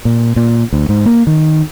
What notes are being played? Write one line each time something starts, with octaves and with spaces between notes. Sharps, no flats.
A#2
A#2
D2
G#2
A#3
D#3